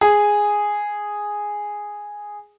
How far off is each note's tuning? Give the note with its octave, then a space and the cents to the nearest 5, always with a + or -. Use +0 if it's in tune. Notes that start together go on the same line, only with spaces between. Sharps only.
G#4 -5